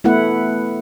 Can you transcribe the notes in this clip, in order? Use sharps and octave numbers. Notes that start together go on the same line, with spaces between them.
A3 B3 E4 B4 F#5